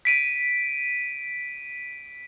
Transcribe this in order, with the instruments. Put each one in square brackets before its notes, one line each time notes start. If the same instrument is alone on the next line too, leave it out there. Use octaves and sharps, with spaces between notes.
[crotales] B6 D7 D#7